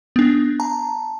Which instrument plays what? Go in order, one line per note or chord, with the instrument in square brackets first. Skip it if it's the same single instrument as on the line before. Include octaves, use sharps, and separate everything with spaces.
[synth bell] B3 D4
A5 A#5